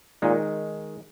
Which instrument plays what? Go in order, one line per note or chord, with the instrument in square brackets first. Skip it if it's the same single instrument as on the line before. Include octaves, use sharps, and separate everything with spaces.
[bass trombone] A#2 [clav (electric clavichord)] D#3 G#3 D#4